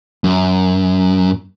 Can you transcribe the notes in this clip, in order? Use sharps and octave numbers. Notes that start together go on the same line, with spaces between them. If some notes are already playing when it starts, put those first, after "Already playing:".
F#2